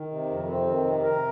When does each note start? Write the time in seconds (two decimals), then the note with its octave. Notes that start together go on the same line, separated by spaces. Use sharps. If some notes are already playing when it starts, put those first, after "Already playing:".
Already playing: D#3
0.11 C3
0.30 F2
0.48 C4
0.67 D#3
0.85 C3
1.04 A#4